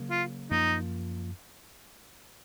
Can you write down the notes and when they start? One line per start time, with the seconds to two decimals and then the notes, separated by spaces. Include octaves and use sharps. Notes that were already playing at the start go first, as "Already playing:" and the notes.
Already playing: C#3 F#3 A#3
0.10 F4
0.51 F#2 F3 A#3 D#4